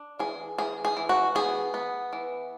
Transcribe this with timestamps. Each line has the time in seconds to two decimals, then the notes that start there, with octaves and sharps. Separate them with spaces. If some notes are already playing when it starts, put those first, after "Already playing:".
Already playing: D4
0.19 E3 G#4
0.58 E3 G#4
0.85 G#4
0.97 E3
1.09 F#4
1.35 B3 G#4
1.74 B3
2.13 E3